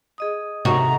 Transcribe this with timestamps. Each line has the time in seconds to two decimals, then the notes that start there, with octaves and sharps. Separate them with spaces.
0.18 G#4 D#5 D#6
0.65 A2 C3 D#3 F#4 A#5